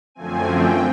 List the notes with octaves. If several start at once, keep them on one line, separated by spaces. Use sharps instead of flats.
F#2 D3 F3 A3 C4 G#5
G5